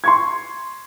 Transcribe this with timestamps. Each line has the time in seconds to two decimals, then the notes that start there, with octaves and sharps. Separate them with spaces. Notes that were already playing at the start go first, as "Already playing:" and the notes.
0.04 C6 C#6 G#6